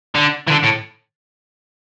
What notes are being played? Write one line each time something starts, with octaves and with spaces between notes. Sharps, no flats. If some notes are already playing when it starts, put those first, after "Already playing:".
D3
E3
D3
A2